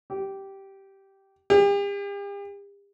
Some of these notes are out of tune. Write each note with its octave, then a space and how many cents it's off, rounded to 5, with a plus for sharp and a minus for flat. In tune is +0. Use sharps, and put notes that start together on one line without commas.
G4 -10
G4 +40